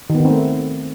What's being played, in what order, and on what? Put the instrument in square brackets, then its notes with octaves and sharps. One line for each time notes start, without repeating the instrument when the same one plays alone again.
[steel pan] D#3
B3
D#3
C4
A3